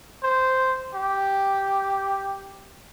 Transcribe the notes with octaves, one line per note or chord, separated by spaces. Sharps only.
C5
G4